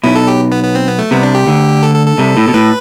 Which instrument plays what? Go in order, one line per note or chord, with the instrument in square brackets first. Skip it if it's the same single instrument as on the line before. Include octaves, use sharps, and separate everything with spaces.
[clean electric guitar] B1 B2 [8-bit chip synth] E4
[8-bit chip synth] A4
G4
B3
B3
C4
B3
A3
[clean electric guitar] C2 C3 [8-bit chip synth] B3
[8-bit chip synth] D4
G4
[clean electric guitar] D2 D3
[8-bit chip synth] A4
A4
A4
[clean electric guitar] C2 C3
A2
B2
[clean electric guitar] A2 [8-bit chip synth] B4